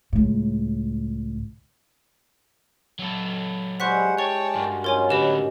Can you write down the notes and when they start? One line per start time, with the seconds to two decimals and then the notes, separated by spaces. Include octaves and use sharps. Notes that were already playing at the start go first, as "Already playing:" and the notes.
0.13 C#2 A2
2.99 F#3 A4
3.80 G3 G#3 E4 C5 F#5 C#6 F#6 B6
4.18 C#5 D5 G5 A5 C#6
4.55 G2 F4 F#4 A#4
4.84 F#3 C#4 D#4 F4 A#4 C#5 G#5
5.10 A2 D3 G4 B4 D#5